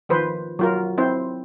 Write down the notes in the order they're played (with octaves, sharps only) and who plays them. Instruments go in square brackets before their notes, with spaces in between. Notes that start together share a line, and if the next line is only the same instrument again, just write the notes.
[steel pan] D#3 F3 B4 C5
F#3 F4 A#4
C4 E4 C5